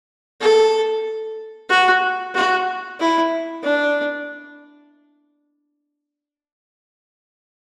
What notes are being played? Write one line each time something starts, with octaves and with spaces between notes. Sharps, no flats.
A4
F#4
F#4
E4
D4